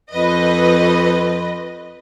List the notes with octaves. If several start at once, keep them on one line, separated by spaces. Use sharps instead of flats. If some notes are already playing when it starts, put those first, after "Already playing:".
F2 B4 D#5